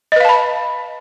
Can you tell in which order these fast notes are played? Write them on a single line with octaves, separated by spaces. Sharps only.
D#5 B4 F5 A5 B5